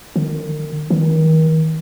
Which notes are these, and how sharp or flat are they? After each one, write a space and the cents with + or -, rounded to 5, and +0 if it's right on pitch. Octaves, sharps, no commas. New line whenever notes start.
D#3 -40
D#3 +35